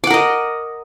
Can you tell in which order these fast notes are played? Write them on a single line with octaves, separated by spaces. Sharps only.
D6 F#5 A#4 D#5